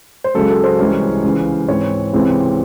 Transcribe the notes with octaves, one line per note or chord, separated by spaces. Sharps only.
C5
C#2 C#3 F#3 A4
A4
C5
C2 C3 E3 G#3 C#4
C#2 C#3 E3
G#2 E3 C4 C#5
C#2 C3 E3 C4